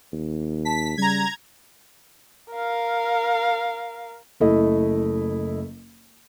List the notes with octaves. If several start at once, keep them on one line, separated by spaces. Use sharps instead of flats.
D#2
A5 B6
C#3 G3 A#5 G#6
A#4 F5
F#1 A3 E4 D#5